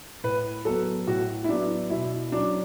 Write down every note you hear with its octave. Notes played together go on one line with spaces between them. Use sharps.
A2 B4
F#3 B3 A4
A2 F#4
E4
F#3 B3 D4
B2 E4
F#3 C#4 D4